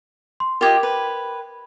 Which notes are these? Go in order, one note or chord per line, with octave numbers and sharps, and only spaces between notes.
C6
F4 G4 A#4 D#5 G5 G#6
B4